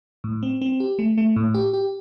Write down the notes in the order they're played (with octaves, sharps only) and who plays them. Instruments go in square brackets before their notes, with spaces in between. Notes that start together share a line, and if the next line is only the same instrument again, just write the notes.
[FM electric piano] A2
C4
C4
G4
A3
A3
A2
G4
G4